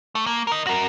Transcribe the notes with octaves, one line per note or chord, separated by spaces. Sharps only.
A3
A#3
A#4 D#5
F#4 A#4